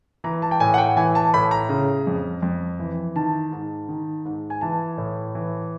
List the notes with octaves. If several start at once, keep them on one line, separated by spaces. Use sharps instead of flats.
E3 A#5
A5
G5
A2 G#5
F#5
G5
E3 G#5
A5
A2 B5
A#5
C#3
F2
F2
E3
D#3 A5
G#2
D#3
G#2
G#5
E3 A5
A2
E3